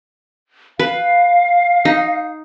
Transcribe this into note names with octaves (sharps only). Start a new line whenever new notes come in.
B4 F5
D#4